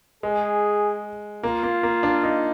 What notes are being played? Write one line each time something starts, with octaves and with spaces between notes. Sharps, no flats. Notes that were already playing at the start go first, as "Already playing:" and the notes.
G#3 G#4
A#3 F4
A#3
A#3
D4
D#4